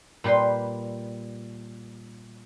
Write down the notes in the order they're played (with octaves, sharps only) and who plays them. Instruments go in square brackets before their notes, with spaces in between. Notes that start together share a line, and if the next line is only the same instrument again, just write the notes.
[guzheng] A#2 G3 G4 B4 C6